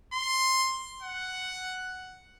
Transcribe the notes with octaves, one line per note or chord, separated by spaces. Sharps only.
C6
F#5